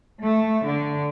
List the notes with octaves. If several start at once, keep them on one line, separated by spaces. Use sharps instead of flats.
A3
D3